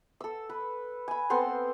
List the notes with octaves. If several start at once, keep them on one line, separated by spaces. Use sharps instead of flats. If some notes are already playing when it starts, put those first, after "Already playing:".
A4 E6
B4
G#5 B5
B3 C4 A4 C6